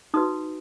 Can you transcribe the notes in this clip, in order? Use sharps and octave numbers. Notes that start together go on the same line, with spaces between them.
D#4 F#4 B4 D#6